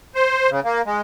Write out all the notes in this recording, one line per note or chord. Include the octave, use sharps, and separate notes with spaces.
C5
C#3
A#3
G#3